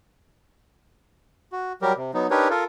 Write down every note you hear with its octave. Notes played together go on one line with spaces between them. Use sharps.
F#4
F#3 G3 G4 A#4
C3
F#3 B3 D#4
D4 D#4 G4 A#4 B4 C#5
F4 A4 A#4